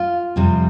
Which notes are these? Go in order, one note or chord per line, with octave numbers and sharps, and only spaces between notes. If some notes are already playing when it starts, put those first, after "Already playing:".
Already playing: F4
F2 C3 G3 C4